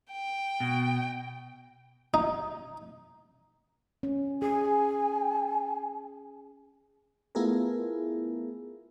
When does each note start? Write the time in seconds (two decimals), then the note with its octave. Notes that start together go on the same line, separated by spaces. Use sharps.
0.11 G5
0.60 B2
2.14 D#4
4.03 C#4
4.42 G#4 G#5
7.35 A3 B3 E4 F4 G#4 A#4